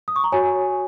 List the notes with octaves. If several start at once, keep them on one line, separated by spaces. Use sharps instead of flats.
D#6
C#6
A#5
F#4 C#5 G#5